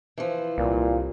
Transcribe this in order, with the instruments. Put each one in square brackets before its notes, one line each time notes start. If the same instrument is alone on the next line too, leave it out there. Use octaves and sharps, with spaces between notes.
[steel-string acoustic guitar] E3 F3
[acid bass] C2 [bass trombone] A#2